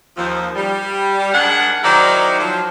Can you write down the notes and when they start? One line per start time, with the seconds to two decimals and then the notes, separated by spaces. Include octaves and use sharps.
0.16 D#2 F3
0.56 G3
1.33 G#2 D4 G#4 A#4 F#5
1.84 D#3 F#3 D#4 E4 C5 D5
2.39 F3 F#3